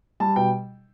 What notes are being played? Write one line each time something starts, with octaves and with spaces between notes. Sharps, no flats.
G3 A5
B2 G5